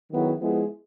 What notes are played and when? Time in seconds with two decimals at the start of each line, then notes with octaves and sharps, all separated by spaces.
0.12 D#3 F#3 B3 E4 G#4
0.40 F3 G#3 B3 E4 G#4